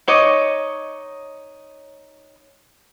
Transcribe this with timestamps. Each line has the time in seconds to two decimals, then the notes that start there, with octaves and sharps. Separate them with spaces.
0.08 D#4 C#5 D#5 D6